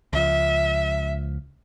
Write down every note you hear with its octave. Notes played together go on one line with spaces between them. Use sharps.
C#2 F3 E5